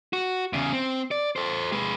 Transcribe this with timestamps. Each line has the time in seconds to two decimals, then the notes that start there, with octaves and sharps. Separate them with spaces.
0.13 F#4
0.53 E2 C#3
0.73 C4
1.11 D5
1.36 A4 C5
1.72 G#3 B4